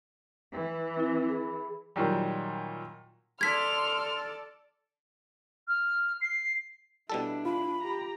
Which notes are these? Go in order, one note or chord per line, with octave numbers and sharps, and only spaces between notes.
E3
C4 E4
G#4 B5
A#2 D#3 F#3 G3
A4 D5 C6 F6 G#6 B6
F6
C7
B2 G3 D4 E4 A4
F4 B5
G4 A#5